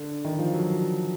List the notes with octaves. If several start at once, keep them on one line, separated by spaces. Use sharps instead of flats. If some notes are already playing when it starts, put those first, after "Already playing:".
Already playing: D3
D#3
F3
F#3